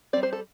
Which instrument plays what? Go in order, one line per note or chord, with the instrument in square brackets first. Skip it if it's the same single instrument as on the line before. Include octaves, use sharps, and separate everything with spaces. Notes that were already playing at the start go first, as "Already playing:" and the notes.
[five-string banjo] C4 D5
G3
C5
A4